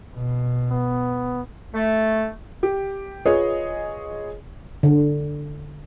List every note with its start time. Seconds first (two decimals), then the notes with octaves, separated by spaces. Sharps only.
0.15 B2
0.70 B3
1.73 A3
2.63 G4
3.25 F4 G#4 B4 C#5 D#5
4.83 D3